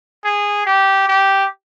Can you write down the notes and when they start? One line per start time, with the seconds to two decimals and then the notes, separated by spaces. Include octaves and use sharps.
0.24 G#4
0.66 G4
1.08 G4